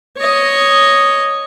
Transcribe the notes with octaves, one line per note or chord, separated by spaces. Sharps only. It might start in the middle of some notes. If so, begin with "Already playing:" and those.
C#5 D#5